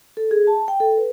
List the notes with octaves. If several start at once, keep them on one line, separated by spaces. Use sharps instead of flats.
A4
G#4
A5
G5
A4
B4